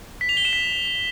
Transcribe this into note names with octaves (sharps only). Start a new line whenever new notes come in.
B6
F7
G7
E7
B6